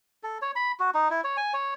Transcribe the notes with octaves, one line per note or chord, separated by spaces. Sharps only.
A4
C#5
B5
F#4
D#4
E4
C#5
G#5
C#5